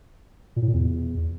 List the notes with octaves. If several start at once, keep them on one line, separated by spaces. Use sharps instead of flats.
A#2
A2
A#2
E2